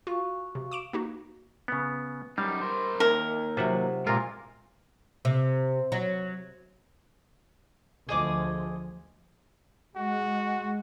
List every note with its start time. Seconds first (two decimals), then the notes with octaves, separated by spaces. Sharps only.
0.07 F4 F#4 F5 C#6
0.55 C3
0.71 D6 D7 E7
0.93 A#3 D#4 F#4
1.68 C#3 B3
2.38 F#2 G3 D#4 F5
2.62 A#4 C5
3.00 D#2 A#4 E5
3.57 C3 F#3 F4 E5 F#5
4.07 A#2 G#3 F4 A#4
5.25 C3
5.92 F#3
8.09 D2 F3 G#4 D#5 D6
9.96 G#3 F#4